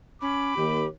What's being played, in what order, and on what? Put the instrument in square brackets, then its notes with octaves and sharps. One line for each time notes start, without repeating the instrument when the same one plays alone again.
[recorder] C#4 [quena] B5 [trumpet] D6
[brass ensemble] D#2 [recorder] G4